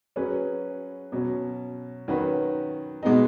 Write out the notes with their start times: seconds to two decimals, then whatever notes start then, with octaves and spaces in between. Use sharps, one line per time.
0.16 F#3 C#4 G#4 B4
1.12 B2 F#3 C#4
2.08 D#3 F#3 C#4 F#4 B4
3.03 B2 G#3 B3 D#4